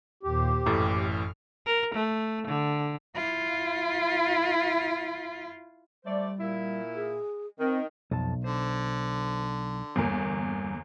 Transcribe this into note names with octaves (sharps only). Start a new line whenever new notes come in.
D#2 A#2 G4 C5
A1 F#2 A2 E3 A4 F6
A#4
A3
D3
E4 F4
G3 A3 C5 D5
A#2 E4
G#4
D#3 C4
B1 F2 A5
D3 C5
G1 E2 G3 A#3